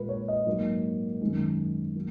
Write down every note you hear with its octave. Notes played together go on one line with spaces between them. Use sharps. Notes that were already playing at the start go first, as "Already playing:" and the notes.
Already playing: A#2 G#3 A#4 B4
C#5
D#5
G#2 F#3 A#3
F#2 D#3 G#3
F#3 A#3